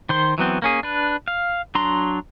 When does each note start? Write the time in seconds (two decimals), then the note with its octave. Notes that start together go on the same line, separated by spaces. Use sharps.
0.09 D#3 C5 C6
0.38 E3 F#3 B3 C4
0.62 A#3 C#4 G#4
0.83 D4 B4
1.28 F5
1.75 F#3 D4 A#5 C6